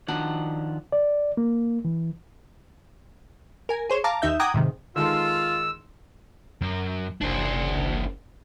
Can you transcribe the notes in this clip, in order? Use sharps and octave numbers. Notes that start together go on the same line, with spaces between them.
D#3 F3 F#3 D4 F#5
D5
A#3
E3
A#4 G#5
G#4 C5 C#5
F5 A5 A#5 D6
D#2 D#4 E5 G6
F#5 G5 A#5 D6 D#6 G#6
G#2 C3 D#3
D#3 G#3 F4 A4 E6
F#2
F#1 D4 C5